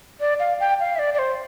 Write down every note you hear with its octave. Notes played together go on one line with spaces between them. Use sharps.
D5
F5
G5
F5
E5
D5
D5
C5